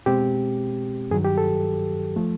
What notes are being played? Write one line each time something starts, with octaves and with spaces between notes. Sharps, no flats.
B2 G#3 C4 G4
G2 D#3 F#3 G#4
G4
A4
F3 A3